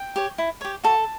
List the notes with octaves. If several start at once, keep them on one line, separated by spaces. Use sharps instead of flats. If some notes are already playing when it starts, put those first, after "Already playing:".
Already playing: G5
G4 C#5
E4
G4 C#5
F#4 A4 A5